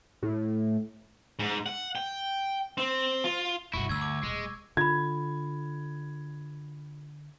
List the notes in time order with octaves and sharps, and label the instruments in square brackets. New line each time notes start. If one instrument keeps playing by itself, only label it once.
[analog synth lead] A2
[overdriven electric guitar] G#2
F#5
G5
C4
F4
[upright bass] G2 C3 [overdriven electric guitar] E4 F#4 [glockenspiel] C#6
[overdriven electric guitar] D2 [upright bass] G2 [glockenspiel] E6 G#6
[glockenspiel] D6
[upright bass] D#1 [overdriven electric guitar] G#3
[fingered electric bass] D3 [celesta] F4 B5 [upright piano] G#6